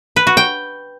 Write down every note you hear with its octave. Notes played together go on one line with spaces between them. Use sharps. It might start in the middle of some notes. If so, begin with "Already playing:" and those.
B4
F#4
G5